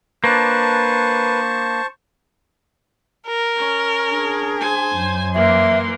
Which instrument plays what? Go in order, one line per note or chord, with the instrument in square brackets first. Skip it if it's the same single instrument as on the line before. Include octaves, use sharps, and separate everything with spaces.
[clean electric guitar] A#3 D4 [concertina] B4 [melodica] C5 A5 C#6
[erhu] A#4
[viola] C#4
[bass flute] D4 [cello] G#4
[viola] C5 G#5
[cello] F#2
[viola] E3 A#3 [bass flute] E5 [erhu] C6